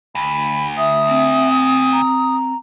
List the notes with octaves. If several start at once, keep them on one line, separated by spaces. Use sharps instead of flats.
D2 B5
E5 D#6
C4
A#5